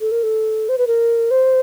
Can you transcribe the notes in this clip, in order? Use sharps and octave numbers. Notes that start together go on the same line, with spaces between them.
A4
A#4
A4
C5
B4
A#4
C5